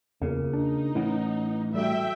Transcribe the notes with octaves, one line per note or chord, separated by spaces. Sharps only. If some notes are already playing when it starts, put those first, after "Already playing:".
E2 C#3 A#3 F4
D4 D#4
A2 E3 C#4 E4 F#5
G3 F#4 A4 E5 G5